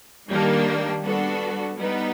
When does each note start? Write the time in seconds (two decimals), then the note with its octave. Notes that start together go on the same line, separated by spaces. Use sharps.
0.30 D#3 G3 A#3 D4
1.03 G3 B3 D4 F#4 A4
1.77 G3 B3 D#4